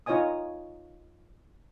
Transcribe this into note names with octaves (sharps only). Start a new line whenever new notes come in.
D#4 F4 C#5 D#5 G#5 D#6